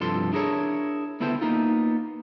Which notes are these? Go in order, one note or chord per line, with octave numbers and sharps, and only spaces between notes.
C2 G2 F3 A4 C6
D4 E4 G#4 A#4 B4 C#5
D2 B3 E4 A4 C5 G5
A#3 B3 D#4 F4